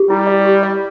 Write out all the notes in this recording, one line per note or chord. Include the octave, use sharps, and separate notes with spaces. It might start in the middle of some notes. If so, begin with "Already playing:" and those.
Already playing: G4
G3 E4
D5
G4
D5